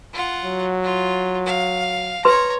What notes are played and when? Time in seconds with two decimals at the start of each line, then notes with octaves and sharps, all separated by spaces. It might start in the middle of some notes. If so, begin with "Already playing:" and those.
0.13 F4 F#5
0.44 F#3
0.84 F4
1.46 F5
2.25 B4 C#5 A#5 C6